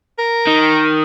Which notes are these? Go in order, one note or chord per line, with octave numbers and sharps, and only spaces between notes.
A#4
D#3